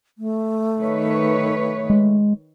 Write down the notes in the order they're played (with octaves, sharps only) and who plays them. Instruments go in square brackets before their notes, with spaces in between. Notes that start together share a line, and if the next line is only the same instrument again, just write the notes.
[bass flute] A3
[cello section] D#3 B4 C#5
[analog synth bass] G#3